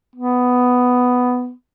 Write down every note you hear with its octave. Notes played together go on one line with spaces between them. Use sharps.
B3